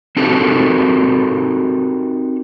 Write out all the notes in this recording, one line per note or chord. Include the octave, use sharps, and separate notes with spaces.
C4 D#4 F#4 G4 A4 A#4